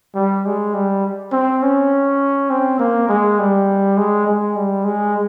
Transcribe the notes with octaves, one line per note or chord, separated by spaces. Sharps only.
G3
G#3
G3
C4
C#4
C4
A#3
G#3
G3
G#3
G#3
G3
G#3